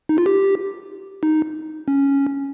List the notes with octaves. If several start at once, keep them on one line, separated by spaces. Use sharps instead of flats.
D#4
F4
G4
D#4
C#4